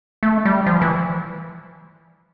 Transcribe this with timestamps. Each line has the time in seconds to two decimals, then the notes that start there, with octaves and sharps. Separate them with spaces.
0.23 A3
0.45 G3
0.66 F3
0.82 E3